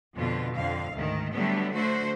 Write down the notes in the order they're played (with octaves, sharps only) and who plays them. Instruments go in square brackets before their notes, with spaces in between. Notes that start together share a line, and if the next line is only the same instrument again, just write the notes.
[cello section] F2 B2 D3 F4
F2 D3 F5
D2 G#2 D#3
D3 F#3 G3 A3 B3
D3 A3 F#4 C5